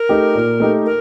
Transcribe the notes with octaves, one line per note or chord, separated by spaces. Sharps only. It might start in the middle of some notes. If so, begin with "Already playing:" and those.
Already playing: A#4
A3 D#4 G4
A#2
A3 D#4 G4
A#4